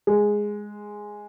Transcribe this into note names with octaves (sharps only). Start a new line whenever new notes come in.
G#3